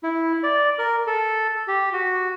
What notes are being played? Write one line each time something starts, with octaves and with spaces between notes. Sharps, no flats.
E4
D5
A#4
A4
G4
F#4